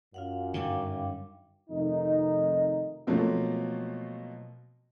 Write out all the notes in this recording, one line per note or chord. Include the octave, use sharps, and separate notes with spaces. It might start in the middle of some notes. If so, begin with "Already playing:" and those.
F#2 F4 F5 F#5
G2 D3 D#3 F5 G5 D6
F2 C3 D#3 A3 D#4
B2 F3 F#3 A3 A#3 C4